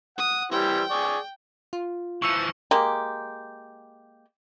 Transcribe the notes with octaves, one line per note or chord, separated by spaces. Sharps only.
F#5 D#6
E3 G3 C5 G5
G#4 D5 C#6
F4
E3 F3 C#6 E6 C#7
G#3 A#3 G4